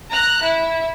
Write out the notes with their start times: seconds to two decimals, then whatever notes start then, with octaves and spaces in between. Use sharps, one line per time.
0.11 A#5 F#6
0.41 E4